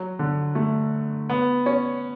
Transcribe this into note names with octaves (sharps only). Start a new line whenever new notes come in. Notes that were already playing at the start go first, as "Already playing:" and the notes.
Already playing: F#3
D3
A3
B3
C#4